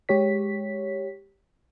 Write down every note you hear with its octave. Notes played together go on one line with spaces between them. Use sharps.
G#3 G4 C#5 B6